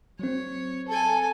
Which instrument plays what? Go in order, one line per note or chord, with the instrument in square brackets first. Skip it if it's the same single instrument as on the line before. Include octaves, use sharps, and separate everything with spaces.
[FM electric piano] F#3 C4 [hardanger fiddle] C#5
[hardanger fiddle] A4 G#5 [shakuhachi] A5